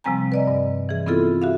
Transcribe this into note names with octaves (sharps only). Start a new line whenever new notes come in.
C3 F3 G3 C4 G#5 A#5
B4 D5 D#5
G2
E3 G#4
B3 C4 E4 F4 G#4 A4
F#4 E5 F5